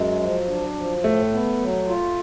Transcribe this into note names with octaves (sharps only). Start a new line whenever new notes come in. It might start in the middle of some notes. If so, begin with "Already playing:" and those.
Already playing: F#2 F#3 G#3
F3
D4
F3
A2 A3
B3
F#3
F4